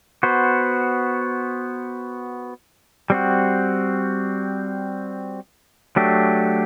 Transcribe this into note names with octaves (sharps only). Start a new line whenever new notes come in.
B3 F#4 C5
G3 C4 F#4
F#3 A3 D4 G4